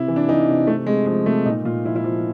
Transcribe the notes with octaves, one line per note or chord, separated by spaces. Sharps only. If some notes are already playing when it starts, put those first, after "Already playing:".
Already playing: C3 E4
E3
D4
E3 D#4
C3
C3 A3
C3 G#3
F3 G#3
C3 A3
A#2 D#4
A#2 F4
F3 E4
E4
F3 F4